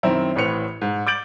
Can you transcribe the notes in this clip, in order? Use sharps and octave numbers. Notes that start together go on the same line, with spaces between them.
F#2 D#3 C4 E4 A#5
A1 A2 B4 C5 C#7 F7
G#2
D6 G6 A6 D7 F#7